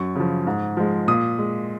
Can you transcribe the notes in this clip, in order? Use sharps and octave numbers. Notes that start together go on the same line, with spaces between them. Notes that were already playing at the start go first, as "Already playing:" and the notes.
Already playing: F#2 C#6
C#3 F3
G#2
F3 G#3
A#2 D#6
G#3